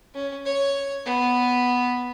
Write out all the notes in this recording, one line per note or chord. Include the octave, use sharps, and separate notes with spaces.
C#4
C#5
B3